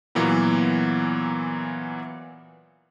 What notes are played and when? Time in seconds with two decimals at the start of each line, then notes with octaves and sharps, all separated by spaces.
0.15 A#2 E3 F#3 A#3 B3